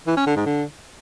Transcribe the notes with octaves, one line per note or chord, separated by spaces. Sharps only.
E3
C#4
D3
G#2
D3